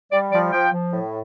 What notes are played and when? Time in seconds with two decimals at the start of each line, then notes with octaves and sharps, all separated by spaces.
0.11 G3 D5
0.32 F3 D5
0.52 F3 G5
0.72 F3
0.93 A2